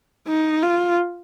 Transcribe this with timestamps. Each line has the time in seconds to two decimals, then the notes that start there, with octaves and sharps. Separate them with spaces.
0.28 D#4
0.63 F4